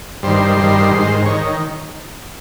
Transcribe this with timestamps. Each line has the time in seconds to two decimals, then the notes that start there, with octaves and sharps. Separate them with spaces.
0.23 G2 D#3 C5
0.57 G2 D#3
0.91 G#2 D#3
1.26 D#3 C#5